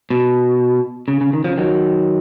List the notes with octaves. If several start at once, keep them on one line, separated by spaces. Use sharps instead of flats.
B2
C#3
C#3
D#3
C#3 F3
D#3 F#3